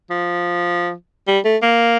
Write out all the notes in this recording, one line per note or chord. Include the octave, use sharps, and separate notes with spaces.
F3
G3
A3
A#3